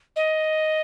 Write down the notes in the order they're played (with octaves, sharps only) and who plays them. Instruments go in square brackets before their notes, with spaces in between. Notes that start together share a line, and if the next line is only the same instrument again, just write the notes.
[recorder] D#5